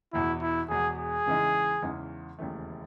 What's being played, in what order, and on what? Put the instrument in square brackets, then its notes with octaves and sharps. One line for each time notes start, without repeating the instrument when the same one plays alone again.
[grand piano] E1 E2 B2 [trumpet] E4
[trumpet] E4
[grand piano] E1 E2 B2 [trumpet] G#4
[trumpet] G#4
[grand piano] E2 C#3 E3 G#3 D#4
E2 C#3 E3 G#3 D#4
E1 D#2 C#3 E3 A3